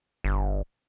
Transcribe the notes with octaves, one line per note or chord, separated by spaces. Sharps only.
G1